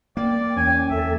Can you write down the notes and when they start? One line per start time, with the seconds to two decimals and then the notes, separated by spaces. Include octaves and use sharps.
0.17 A#3 D5 G5
0.56 E2 C#4 G#5
0.90 E2 A4 E5